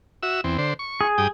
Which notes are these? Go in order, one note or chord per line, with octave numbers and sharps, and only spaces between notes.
F#4 E5 E6
E2 C4
D3 C5
C#6
G#4
G2 G5 D#6